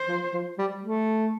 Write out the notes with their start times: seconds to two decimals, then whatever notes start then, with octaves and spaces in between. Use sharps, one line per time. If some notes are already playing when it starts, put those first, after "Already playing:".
Already playing: C5
0.09 F3
0.34 F3
0.58 G3
0.83 A3